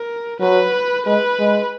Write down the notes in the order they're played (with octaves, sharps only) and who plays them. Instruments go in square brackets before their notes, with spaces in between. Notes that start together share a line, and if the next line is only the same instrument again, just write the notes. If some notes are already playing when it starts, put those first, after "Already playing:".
Already playing: [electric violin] A#4
[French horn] F#3 [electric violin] B4
[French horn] G#3 [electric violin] B4
[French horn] G#3